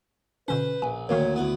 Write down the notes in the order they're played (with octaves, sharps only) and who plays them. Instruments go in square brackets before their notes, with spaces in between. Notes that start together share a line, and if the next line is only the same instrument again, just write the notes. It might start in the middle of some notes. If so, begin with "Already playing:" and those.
[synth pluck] B2 D3 C#4 [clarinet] B4 [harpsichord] C5
[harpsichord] A#1 [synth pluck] G#5
[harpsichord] D2 A#2 [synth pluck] D#3 A#3 A#4 [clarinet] C#5
[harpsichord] D2 B3 [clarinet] E4